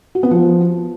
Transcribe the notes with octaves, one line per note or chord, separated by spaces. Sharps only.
F#4
B3
F3